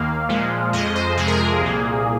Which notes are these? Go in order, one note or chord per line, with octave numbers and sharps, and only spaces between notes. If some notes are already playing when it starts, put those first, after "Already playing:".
Already playing: D#2 D#3 A#3 F5
A#2 F3 G#3
F2 F3 G#3 D#5
C5
F2 C3 F3 G#3 G#4
A#4
G#4
C2 A#2 A#3